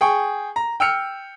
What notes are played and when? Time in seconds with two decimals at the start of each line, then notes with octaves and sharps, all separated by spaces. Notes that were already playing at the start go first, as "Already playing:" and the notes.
0.01 G#4 G5 C#6
0.56 A#5
0.80 G5 E6 F6 C#7